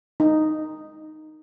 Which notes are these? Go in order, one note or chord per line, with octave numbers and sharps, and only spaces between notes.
D#4